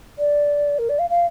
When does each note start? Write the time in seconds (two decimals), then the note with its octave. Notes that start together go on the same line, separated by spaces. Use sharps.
0.18 D5
0.78 A#4
0.89 D5
0.98 F5
1.09 F5